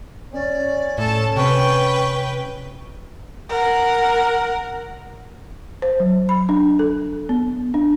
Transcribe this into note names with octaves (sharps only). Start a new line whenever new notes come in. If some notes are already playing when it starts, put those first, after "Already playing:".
C#4 D5
A2 A4 A5
C3 B4 G5 C#6
A#4 F#5
C5
F#3
B5
D4
A4
B3
D4